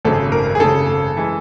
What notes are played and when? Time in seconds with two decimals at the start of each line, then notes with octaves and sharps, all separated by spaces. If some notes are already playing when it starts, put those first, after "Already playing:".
0.05 G#1 F#2 C#3 A4
0.32 A#4
0.55 G#4
0.60 G#1 F#2 C#3 A4
1.17 E3 G#3